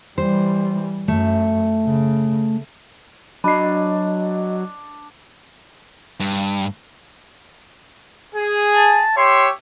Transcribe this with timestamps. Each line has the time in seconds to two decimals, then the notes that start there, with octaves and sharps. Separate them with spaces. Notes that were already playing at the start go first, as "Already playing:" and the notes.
0.18 E3 G3 C5
1.08 F#2 A3
1.85 C#3
3.44 F#3 D4 D#5 B5 C7
6.20 G2
8.35 G#4
8.76 A5
9.17 G4 C#5 E5 C6